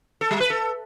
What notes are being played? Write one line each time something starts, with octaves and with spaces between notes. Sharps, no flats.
A4
G3
B4
A4